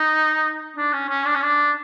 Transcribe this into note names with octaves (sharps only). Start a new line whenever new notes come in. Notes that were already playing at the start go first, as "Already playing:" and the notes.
Already playing: D#4
D4
C#4
C#4
D4
C#4
D4